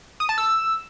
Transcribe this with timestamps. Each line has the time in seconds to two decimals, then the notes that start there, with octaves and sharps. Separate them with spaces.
0.20 D#6
0.29 A5
0.38 E6